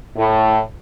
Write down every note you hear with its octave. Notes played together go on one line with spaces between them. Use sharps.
A2